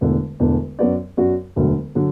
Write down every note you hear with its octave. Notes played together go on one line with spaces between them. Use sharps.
E1 E2 D3 A3 D4
E1 E2 D3 A3 D4
F#2 F#3 B3 F#4 D5
F#2 F#3 B3 F#4 D5
E1 D2 D3 F#3
D3 F#3